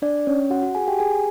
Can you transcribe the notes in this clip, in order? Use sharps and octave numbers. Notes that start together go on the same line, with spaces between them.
D4 D5
C#4 C#5
F#4 F#5
F#4 F#5
G#4 G#5
G4 G5
G#4 G#5